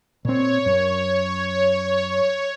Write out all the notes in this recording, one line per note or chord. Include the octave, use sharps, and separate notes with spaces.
A#2 C4 C#5
F#2